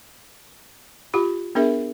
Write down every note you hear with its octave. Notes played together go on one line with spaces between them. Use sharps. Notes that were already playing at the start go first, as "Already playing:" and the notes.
F4 G4 B5
B3 D4 G#4 A#4 E5